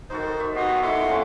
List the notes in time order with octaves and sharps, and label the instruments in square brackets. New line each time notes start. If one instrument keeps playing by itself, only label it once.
[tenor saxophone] D#3 [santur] D#4 F#4 A4 [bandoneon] C5
[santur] E5
[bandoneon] B3 F#4 [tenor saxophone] D#4 [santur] G4 C6
[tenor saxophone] A3 [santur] E4 [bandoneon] F#5 C6 D6
[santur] A#3 C4 C#4